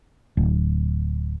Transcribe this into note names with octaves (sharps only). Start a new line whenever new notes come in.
D1